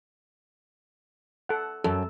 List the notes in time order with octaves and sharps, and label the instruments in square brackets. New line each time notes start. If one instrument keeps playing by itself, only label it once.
[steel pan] A4 F#5
[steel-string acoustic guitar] F#2 [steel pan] A4